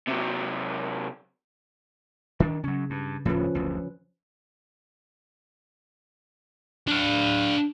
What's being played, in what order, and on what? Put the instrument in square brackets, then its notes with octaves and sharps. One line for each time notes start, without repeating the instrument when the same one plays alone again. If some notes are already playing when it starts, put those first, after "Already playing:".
[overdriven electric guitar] C3 F#3
[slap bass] D#3 D4
[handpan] C#3 [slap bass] F#3 C#4
[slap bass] G2
[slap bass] D#1 D2 A2 [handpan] F3 C#4 B4
[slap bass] F#1 D2
[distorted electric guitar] D4 F5